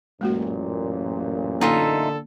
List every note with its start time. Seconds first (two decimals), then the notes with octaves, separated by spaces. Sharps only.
0.21 A1 F#2 A#2 G#3 A#3 F#4
1.61 D3 A#3 D#4 F4 A4 E5 G#5